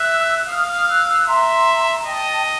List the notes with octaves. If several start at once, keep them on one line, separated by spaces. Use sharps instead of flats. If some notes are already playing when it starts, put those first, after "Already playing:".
Already playing: E5 E6 F#6
F5 D#6 F6
D#6 F6
E6 F#6
E6 F#6
E5 A#5 C6
D#5 G5 A5